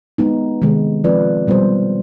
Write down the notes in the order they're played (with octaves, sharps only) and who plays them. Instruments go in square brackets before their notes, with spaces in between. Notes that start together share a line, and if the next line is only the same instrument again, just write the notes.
[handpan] G#3 B3 D#4
C3 D#3 G#3
F3 C4 F4 B4 D5
B2 G3 B3 F4 C5